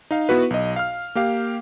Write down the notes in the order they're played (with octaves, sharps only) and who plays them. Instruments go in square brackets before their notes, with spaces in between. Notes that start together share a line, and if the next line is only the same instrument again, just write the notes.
[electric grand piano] D#4 F5
B3 E4 F#4 B4
B1 D#5
F5 F6
A#3 G4 F5